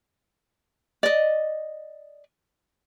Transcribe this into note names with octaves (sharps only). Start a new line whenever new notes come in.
D5 D#5